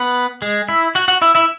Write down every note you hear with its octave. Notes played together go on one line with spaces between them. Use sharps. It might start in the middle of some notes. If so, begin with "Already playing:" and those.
Already playing: B3 B4
G#3 G#4
E4 E5
F#4 F#5
F#4 F#5
E4 E5
E4 E5